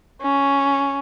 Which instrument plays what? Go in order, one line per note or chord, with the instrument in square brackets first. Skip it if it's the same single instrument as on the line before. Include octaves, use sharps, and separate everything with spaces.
[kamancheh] C#4